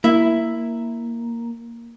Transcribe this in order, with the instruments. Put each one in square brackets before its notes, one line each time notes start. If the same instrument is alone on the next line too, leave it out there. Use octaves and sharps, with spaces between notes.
[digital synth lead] A#3 [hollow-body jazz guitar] E4 E5